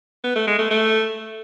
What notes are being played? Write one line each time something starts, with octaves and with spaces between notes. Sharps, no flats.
B3
A3
G#3
A3
A3